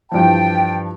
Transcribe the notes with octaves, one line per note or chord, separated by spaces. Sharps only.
G2 E3 F3 G5 A5